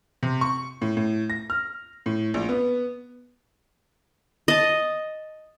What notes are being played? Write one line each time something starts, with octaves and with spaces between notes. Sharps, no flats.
C3
C#6
A2
A2
A#6
F6
A2
A#1
B3
D#5 A5